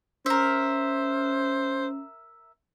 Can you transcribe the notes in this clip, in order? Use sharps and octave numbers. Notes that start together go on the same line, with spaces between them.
C#4 A#4 C5 E5